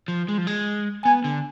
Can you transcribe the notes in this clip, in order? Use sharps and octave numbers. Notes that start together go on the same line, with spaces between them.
F3
G#3
F3
G#3
B3 G#5
D3